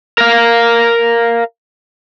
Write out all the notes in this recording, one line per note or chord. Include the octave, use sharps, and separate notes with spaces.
A#4 F5